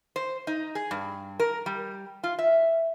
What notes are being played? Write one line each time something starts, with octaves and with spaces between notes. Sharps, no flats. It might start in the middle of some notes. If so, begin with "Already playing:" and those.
C5
D#4
G#4
G2
A#4
G3
F4
E5